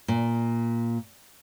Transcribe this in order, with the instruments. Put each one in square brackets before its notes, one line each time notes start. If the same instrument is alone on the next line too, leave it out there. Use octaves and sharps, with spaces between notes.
[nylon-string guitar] A#2